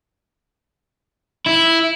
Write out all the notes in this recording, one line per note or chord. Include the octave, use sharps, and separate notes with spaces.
E4